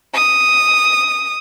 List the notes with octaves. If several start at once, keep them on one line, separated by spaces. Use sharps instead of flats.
D#6